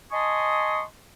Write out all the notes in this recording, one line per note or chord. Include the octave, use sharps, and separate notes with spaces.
D#5 G#5 A5 C6 C#6 D#6